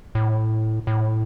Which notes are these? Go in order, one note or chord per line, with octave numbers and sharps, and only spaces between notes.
A2
A2